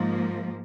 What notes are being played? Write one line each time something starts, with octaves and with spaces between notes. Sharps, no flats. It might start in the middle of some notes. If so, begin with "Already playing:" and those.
Already playing: G#2 F3 A#3